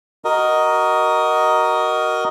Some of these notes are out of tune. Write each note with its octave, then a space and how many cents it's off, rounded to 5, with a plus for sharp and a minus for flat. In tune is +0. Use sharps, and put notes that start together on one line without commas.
F#4 +15 A#4 +0 D#5 +0